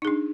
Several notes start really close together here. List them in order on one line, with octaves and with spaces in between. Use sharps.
D#4 G#4 D4